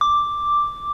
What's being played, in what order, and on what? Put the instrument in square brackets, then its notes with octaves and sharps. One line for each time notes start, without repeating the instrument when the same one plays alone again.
[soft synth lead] D6